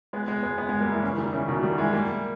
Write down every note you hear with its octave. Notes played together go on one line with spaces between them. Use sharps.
G#3 B3
G#3 B3
G#3 B3
G#3 B3
G#3 B3
G3 A#3
E3 G#3
C#3 E3
D#3 G3
C#3 E3
B2 D#3
D#3 G3
E3 G#3
G3 A#3